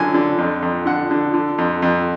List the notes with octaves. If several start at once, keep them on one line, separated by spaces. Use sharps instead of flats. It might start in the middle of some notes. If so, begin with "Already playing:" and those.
Already playing: F#2 D3 G#5
D3
F2
F2
D3 F#5
D3
D3
F2
F2